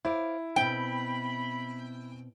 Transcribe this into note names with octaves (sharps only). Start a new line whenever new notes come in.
E4 C5 D5 F5
B2 C4 G5 B5